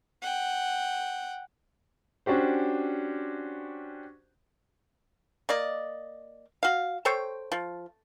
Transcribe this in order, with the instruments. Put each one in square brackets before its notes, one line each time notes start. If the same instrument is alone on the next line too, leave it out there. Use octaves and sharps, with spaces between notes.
[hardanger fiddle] F#5 G5
[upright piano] C#4 D4 F#4 G4 C5
[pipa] A#3 D5 D#5
F#4 F5
A4 C5 C#5 G5
F3